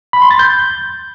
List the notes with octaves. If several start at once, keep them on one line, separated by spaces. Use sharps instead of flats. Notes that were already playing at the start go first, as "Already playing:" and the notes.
B5
C6
A6
G6